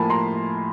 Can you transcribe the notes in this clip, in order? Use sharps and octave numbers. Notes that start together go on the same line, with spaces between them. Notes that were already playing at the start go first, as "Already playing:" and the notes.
Already playing: A2 F3 A#3 G#5 A5 B5
A#5 C6